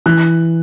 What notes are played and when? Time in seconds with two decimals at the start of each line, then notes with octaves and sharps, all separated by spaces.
0.06 E3 F#6